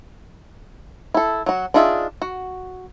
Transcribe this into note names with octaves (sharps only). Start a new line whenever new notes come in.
E4 A4
F#3 F#4
D4 D#4 F4 G#4 E5
F#4